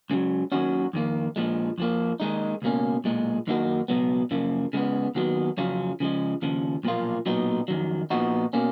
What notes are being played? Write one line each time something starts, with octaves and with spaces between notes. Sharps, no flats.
C#2 C#3 F#3
D#2 D#3 F#3 C#4 F#4
F2 D#3 A#3
A#2 F3 G#3
F2 F3 A#3
D#2 D#3 G#3 D#4
C#2 B2 A#3 C#4
B1 A#2 G#3
F#2 D#3 A#3 D#4 F#4
C#2 B2 F#3 B3
F#2 C#3 F3 A#3
C#3 G#3 B3
D#2 D#3 F#3 B3 F#4
F2 C#3 F#3 C#4 F4
C#3 F3 G#3
D#2 C#3 F3
B1 A#2 F3 A#3 F4
B1 A#2 F#3 B3 D#4
F2 D#3 F#3
A#2 F3 B3 D#4 F#4
B2 A#3 C#4